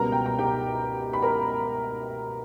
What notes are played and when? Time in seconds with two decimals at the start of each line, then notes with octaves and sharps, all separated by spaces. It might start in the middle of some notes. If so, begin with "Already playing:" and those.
Already playing: C#2 B2 G3 B3 A#4 A#5
0.12 G5
0.26 A#5
0.39 G4 G5
1.13 B5
1.22 A#4 A#5